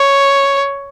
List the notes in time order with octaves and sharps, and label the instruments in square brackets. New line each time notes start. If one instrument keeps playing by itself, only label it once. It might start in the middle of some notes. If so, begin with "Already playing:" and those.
Already playing: [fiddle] C#5